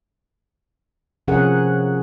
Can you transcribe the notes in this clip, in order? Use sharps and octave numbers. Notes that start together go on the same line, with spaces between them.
C3 F3 C#4 G#4 A#4 F#5